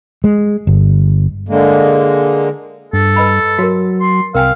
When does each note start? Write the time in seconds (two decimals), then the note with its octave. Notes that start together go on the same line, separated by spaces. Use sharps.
0.24 G#3
0.67 G1
1.49 D3 G#3 A#3
2.93 G2 A4
3.16 B4 D#5 B5
3.58 F#3 F#4 A#4
4.01 C6
4.35 C2 A#4 F5 G5 G#5